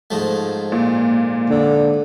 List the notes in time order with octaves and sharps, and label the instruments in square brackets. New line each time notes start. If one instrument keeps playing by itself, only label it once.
[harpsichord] G#2 F3 A3
[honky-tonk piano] A#2
[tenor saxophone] D3